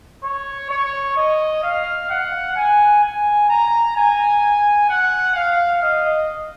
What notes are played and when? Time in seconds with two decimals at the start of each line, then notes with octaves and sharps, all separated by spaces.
0.23 C#5
0.70 C#5
1.16 D#5
1.63 F5
2.10 F#5
2.56 G#5
3.03 G#5
3.49 A#5
3.96 G#5
4.89 F#5
5.35 F5
5.82 D#5